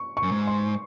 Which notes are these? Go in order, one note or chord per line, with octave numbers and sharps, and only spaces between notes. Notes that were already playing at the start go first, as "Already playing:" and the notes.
Already playing: C#6
C#6
F#2
G#2
C6